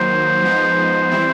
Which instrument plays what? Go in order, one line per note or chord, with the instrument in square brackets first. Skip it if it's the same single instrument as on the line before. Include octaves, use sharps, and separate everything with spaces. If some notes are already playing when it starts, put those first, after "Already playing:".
Already playing: [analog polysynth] D#3 F#3 A#3 D#4 [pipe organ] C5
[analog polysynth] F3 G#3 B3 D#4
E3 G3 C4 E4